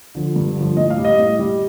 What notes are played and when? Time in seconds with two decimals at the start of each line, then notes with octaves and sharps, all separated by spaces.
0.15 D3 F3
0.36 G2
0.56 D3 F3
0.77 A2 D#5
0.90 F5
0.98 G3
1.05 D#5
1.18 A2
1.39 G3